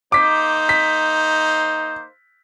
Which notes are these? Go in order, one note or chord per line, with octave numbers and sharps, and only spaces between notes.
A#3 D#4 C5 D6 B6
B6